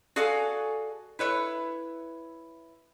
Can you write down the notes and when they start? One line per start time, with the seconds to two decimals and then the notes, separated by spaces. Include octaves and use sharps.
0.16 F#4 G#4 A4 D5 F5 G#5
1.19 E4 B4 C#5